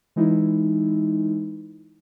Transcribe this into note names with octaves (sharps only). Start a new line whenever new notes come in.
E3 G#3 D#4 E4